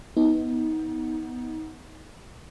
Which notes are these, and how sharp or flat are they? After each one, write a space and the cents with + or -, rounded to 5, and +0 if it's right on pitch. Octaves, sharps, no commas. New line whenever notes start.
B3 +0 D#4 +25